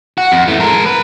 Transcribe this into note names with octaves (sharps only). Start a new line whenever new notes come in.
F#4
F2
E3 A3
G#3 A#4
B4